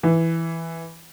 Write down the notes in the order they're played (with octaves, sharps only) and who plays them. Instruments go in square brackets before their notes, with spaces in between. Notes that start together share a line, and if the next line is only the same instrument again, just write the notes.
[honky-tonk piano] E3